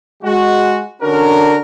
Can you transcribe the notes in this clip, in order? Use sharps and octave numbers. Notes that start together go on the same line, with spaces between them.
G#3 F#4
D3 C#4 D4 F#4 A#4